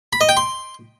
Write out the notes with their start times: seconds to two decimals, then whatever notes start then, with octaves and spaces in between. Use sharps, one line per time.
0.13 B5
0.21 D#5
0.29 G5
0.37 C6